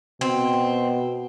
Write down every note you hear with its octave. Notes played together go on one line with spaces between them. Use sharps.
B2 C4